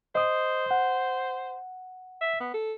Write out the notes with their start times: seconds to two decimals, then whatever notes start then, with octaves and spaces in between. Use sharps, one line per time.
0.15 C5 D#5 D#6
0.71 F#5
2.21 E5
2.40 B3
2.54 A4